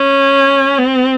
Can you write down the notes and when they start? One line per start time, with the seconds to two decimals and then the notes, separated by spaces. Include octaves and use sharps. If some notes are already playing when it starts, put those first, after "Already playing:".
Already playing: C#4
0.78 C4